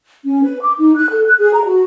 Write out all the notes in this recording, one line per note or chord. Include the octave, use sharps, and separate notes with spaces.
C#4
B4
D6
D#4
F#6
A4
F#6
G#4
A#5
F#4